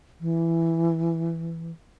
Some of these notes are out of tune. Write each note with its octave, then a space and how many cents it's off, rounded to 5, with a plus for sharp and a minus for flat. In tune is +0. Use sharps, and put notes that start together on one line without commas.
E3 +10